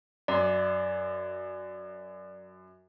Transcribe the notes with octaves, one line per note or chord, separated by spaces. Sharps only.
F#2 D5 C6